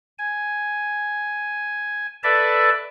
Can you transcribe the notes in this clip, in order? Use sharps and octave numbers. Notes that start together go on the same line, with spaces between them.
G#5
A4 B4 D5 E5 A5